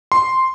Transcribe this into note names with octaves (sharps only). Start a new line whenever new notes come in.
C6